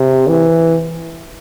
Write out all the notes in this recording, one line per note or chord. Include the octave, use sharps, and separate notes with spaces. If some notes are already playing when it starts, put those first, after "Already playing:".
Already playing: C3
E3